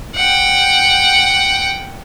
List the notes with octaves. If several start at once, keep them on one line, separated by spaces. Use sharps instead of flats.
F#5 G5